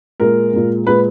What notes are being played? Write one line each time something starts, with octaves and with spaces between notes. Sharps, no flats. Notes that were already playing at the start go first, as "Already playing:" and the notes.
A#2 G#3 A#4
A#2 G#3
A#2 G#3 B4